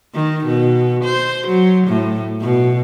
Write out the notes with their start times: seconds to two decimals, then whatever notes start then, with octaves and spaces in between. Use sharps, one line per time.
0.14 D#3
0.46 B2
1.04 C5
1.47 F#3
1.87 A2
2.41 B2